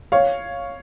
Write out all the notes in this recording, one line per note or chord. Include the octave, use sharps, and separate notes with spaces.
C#5 F5